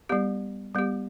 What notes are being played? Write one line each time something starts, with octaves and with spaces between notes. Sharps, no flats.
G3 B3 G4
G3 B3 G4